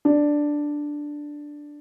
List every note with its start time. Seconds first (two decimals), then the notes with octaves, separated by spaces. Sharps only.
0.05 D4